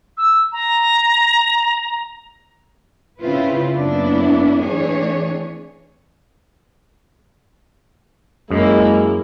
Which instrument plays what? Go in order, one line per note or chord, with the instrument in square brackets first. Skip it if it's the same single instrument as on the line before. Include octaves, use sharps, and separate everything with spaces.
[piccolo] E6
A#5
[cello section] C#3 C4 E4 F4 B4 C5
F#2 A#3 B3 C#4 D4 E4
E3 A3 C4 D4 G#4 C#5
[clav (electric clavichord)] F#2 [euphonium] G#3 [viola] A#3 E4